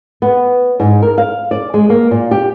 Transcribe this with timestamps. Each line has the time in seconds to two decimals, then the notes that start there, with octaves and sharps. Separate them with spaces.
0.22 B3
0.80 G#2
1.02 A#4
1.18 F5
1.51 D5
1.74 G#3
1.90 A#3
2.11 A#2
2.31 G4